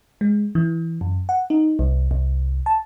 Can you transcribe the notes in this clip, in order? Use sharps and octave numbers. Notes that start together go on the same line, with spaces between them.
G#3
E3
F#2
F#5
D#4
C2
C2
A5